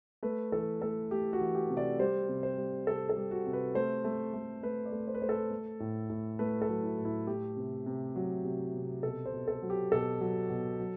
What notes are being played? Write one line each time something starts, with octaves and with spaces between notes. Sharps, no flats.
A3 B4
E3 A4
A3 A4
A3 G4
F#4
E3
G4
C3
D5
G3 C5
C3
C5
G3
C3 A4
A4
G3
F#4
C3
B4
A3 C5
A3
A3
A3 B4
D5
A3
C5
B4
A3 C5
A4
A3
A2
A2
A3 B4
A4
F#3
E4
A2
E4
A3 G4
C3
C3
F#3
C3
C3
B2 A4
C5
B2
A4
F#3
G4
B2 A4
F#3
B2
F#3